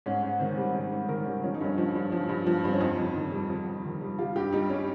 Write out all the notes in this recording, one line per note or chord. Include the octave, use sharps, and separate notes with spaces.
G#2 C#4
G#2
D#3 C4
G3
G#2 C#4
G#2
D#3 A#4
G3 C#4
F3 C#4
D#4
G2 C#4
F3
G2
F3
G2
F3
G2 C4
C#4
F2 D#4
F2
D#3
G3
F2
F2
D#3
G3
G3 F4
G2 G4
G3 D#4
C#4